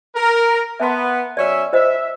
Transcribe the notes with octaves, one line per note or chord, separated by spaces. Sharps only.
A#4
B3 E5 A5 C6
F#2 C#4 D5 E5
F4 C5 D#5 E5